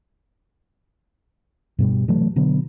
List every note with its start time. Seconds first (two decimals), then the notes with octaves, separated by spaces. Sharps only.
1.79 G2 B2 G3
2.08 C3 E3 F#3 A3
2.36 B2 D3 F#3 B3